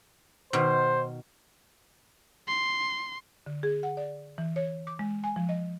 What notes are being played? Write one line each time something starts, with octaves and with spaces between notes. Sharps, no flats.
B2 D#3 C5
C6
D3
G#4
F#5
D5
E3
C#5
D6
G#3
G#5
F3
D#5